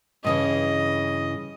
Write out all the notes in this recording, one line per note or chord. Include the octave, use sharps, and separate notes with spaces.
G2 C#3 E3 D#5